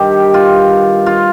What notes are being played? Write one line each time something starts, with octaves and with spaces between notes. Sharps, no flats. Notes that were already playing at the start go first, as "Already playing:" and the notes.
Already playing: G2 D#3 G4
F4
F4